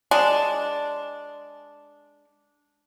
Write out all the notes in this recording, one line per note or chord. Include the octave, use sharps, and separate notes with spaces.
G#3 D4